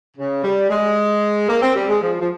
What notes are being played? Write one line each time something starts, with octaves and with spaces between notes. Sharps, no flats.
C#3
G3
G#3
A#3
C4
G3
G#3
F3
F3